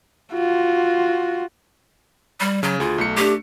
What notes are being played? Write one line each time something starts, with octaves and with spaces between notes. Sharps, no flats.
F4 F#4
G3
C#3 F#3
D2 F4 G#4
B1 A3 C#7
A3 D4 G4